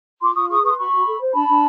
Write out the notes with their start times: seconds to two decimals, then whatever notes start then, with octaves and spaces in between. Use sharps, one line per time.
0.22 F4 C6 D6
0.36 F4 C#6 D#6
0.50 G#4 C#6 D#6
0.63 B4 C#6 D#6
0.71 C6
0.78 F#4 B5 C#6
0.92 F#4
1.06 A4
1.20 C5
1.34 D4 A5 B5
1.48 D4